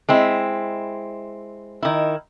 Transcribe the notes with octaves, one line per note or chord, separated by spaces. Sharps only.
G#3 C4 E4
D#3 E4